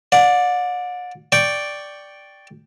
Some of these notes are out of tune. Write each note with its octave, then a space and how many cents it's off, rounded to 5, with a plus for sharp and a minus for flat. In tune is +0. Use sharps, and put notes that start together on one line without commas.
D5 +0 F#5 -40
D5 +0 G5 +0 C#6 +5